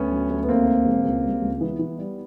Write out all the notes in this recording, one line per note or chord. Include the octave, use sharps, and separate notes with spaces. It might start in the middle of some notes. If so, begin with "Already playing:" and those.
Already playing: D2 B3 C#4
F#3
D2
B3
D#2 A#3 C4
D#2
E1
C#2
G3
C#2
E3 B3
E3
G3